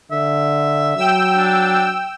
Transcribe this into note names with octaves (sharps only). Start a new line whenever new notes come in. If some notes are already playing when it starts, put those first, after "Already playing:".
D3 E5
F#3 G5 E6
D4